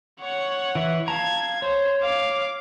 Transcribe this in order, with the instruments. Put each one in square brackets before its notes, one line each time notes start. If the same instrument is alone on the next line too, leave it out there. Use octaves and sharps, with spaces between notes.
[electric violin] C#5 F#5
[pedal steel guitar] E3 E5
[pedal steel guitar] F5 A5 A#5 [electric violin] G#6
[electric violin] C5 [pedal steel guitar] C#5
[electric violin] F5 D6